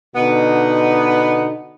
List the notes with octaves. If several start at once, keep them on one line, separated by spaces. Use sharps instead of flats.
B2 D3 B3 D#4